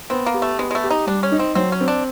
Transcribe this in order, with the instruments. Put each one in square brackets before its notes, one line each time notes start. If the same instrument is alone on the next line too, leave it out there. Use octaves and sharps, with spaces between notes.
[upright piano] B3 [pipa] C4
[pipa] A#3
[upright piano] G4
[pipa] A3
[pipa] G#3 [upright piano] B3
[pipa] G#3
A3
[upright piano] G4
[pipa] D#4
[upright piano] G3 [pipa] D4
[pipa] C#4
[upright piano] D#4
[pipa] C4
[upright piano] F#3 [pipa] C4
[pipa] C#4
[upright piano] C4
[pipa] D4